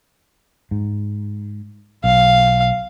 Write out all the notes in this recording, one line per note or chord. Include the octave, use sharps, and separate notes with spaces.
G#2
B1 F5